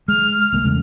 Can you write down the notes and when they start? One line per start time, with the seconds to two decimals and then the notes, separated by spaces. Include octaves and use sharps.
0.08 G#3 F6
0.40 F6
0.52 C2 G#3 A#3
0.64 E2 C#3 A3